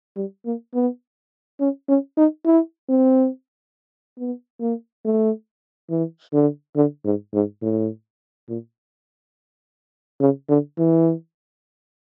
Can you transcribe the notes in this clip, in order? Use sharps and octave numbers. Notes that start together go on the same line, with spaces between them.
G3
A#3
B3
C#4
C#4
D#4
E4
C4
B3
A#3
A3
E3
D3
D3
G#2
G#2
A2
A#2
C#3
D3
E3